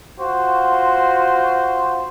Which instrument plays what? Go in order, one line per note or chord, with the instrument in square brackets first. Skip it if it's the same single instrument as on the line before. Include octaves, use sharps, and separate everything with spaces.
[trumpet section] F4 F#4 C5